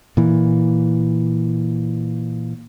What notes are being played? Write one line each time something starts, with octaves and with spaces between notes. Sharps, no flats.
A#2 E3